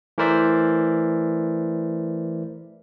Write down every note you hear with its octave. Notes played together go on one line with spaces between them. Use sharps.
E3 A3 A#4 C5 D5 E5